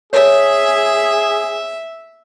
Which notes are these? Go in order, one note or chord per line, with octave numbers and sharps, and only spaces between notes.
G#4 C#5 E5